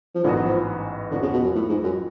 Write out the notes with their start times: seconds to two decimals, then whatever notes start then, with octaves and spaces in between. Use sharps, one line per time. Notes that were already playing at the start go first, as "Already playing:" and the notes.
0.15 F3
0.24 A1 G#2 D3 F#3 B3 F#4
0.45 F3
1.11 F2 D3 F3 B3 F#4
1.22 C#3
1.33 B2
1.44 F#2
1.55 A2
1.69 G#2
1.84 F#2